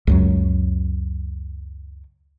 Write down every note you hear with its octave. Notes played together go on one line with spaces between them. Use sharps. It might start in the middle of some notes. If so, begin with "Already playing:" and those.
C#2 F#2 F#3